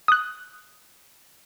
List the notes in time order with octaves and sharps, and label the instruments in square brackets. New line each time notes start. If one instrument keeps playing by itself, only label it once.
[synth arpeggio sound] D#6 F#6